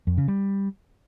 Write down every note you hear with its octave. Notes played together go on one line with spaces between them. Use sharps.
F2
C#3
G3